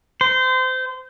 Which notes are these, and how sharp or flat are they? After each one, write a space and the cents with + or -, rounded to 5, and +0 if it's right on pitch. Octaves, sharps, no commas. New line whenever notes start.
C5 -25